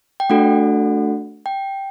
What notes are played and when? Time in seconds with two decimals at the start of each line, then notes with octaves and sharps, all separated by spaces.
0.20 G5
0.30 A3 D4 F#4 A4 F#5
1.46 G5